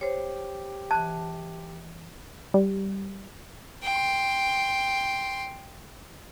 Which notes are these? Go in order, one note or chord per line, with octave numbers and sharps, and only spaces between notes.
G4 C5 C#5
E3 A5 F#6
G3
G5 C6